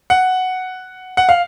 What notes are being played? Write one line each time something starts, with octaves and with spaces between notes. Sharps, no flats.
F#5
F#5
F5